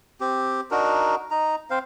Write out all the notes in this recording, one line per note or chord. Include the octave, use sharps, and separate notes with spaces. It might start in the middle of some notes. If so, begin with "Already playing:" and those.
C4 G4
D4 D#4 F#4 A#4
D#4 A#5
C4 C5 F5